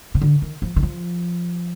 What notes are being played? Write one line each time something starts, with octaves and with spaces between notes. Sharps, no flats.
C3
D3
D#3
F3
D#3
F3